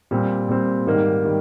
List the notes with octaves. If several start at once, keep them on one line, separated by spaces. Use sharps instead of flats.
A#2 G3 C4
A#2 G3 C4
G#2 D#3 G3 A#3
D#3 G3